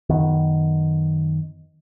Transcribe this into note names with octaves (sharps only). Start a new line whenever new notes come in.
F#2 D#3 B3